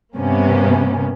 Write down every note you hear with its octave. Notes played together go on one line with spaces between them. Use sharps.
G2 C3 A#3 B3 C#4